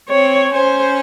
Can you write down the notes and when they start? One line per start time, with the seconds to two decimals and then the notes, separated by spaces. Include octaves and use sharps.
0.09 C4 C#5
0.52 C#4 C5